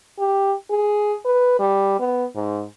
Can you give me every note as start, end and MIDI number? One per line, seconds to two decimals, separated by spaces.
0.18 0.54 67
0.70 1.15 68
1.25 1.56 71
1.59 1.97 55
2.00 2.25 59
2.35 2.64 44